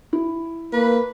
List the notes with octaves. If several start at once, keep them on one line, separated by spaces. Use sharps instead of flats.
E4
A#3 B4